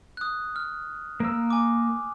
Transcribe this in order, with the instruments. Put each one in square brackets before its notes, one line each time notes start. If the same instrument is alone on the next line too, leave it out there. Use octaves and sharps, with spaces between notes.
[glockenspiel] D#6 F#6
F6
[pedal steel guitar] A#3 E6
[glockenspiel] G#5 D6